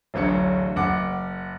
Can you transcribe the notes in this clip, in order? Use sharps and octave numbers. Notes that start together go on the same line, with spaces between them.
D1 A1 F#3 D4 C#7
F#1 F#5 D6